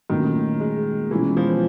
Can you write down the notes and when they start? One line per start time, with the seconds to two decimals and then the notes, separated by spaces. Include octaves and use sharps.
0.10 A#2 D#3 F#3 A3 C#4 F4
0.60 G#3
1.11 B2 E3 G#3 C#4 F4
1.37 F3